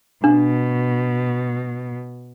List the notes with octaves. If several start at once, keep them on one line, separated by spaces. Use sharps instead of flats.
B2 D4